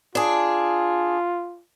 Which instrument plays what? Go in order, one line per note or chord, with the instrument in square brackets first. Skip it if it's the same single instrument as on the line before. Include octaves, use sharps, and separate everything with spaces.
[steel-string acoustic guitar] D4 G#4 [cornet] F4